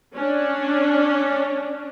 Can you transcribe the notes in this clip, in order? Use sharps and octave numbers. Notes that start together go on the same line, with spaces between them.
C#4 D4